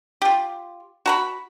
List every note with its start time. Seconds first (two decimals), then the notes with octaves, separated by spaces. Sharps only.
0.22 F4 G4
1.06 F#4 A#5 B5